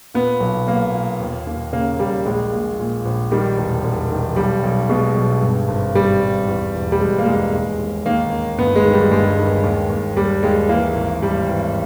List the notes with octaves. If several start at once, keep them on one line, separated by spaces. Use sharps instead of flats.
A#2 B3
B1
B1 A#3
A#2
D#2
D#2
C#3 A#3
D#2 G3
A#1 G#3
A#2
A#2
A#1
D#3 G3
E1
E1
D#3
B1 G3
B1
B2 G#3
B1
G2
G#1
G#1 G3
G2
E2
E1
G3
E1 G#3
A#3
E2 G#3
D#2
D#2
D#3 A#3
D#2
G1 B3
G#3
D#3
G3
G2 G#3
D#3
D#2
D#2
D#2 G3
D#2 G#3
E3 A#3
G#1
G#1 G3
E3